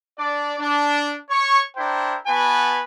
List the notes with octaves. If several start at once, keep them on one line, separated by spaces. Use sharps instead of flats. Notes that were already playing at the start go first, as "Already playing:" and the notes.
D4 D5
D4
C#5 C#6
D4 E4 A#4 C5 G5
B3 F#4 B4 G#5 A5